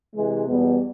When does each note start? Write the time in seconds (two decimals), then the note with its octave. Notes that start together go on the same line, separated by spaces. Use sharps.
0.15 C3 E3 G#3
0.48 E2 B2 G3 B3